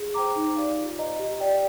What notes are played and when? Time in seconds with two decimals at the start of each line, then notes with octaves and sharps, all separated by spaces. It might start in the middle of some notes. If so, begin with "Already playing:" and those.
Already playing: G#4
0.14 C5 G5 A#5 D6
0.35 D#4
0.56 G4 D5 F5
0.78 F4
0.97 C5 D#5 A#5
1.19 G4
1.40 D5 G5